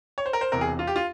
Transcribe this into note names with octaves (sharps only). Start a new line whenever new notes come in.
C#5
C5
A#4
C5
E1 E2 C3 A#4
G#4
F4
G4
F4